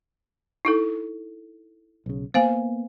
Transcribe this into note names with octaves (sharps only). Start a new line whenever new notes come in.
D#4 E4 A4
B1 C#3
A#3 B3 C5 F5 G#5